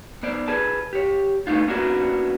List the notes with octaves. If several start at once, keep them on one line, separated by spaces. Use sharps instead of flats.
B3 C5 D5
G#4 B4 A5
G4 C#5
C#3 A3 B3 D#4 F4
A#3 B3 C#4 D4 E4 F#4